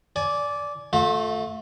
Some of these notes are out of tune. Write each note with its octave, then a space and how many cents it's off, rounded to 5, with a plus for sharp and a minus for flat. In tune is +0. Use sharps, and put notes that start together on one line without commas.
D5 -10 G#5 +20
A3 +0 F4 +40 E5 -25